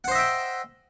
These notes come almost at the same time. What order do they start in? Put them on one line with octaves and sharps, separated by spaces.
F#5 C5 D#5 E5 G5